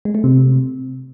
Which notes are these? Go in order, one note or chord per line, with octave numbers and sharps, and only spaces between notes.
G#3
A3
C3